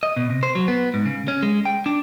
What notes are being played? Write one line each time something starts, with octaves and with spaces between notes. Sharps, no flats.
D#5
B2
C3
C5
F#3
B3
G#2
C#3
C#4
G#3
G5
D4